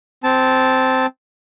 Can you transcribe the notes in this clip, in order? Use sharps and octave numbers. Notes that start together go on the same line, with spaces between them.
C4 A5